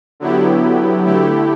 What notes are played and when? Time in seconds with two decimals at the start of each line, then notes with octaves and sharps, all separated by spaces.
0.20 D3 F#3 B3 E4 G4
1.05 D3 A3 E4 G4